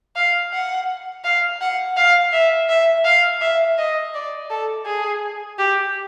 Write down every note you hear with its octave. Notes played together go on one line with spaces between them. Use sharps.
F5
F#5
F5
F#5
F5
E5
E5
F5
E5
D#5
D5
A4
G#4
G4